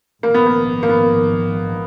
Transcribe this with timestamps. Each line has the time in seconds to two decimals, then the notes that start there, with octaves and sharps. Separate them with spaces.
0.23 A#1 G#2 D#3 A#3
0.34 B3
0.46 A#3
0.83 A#3
0.89 B3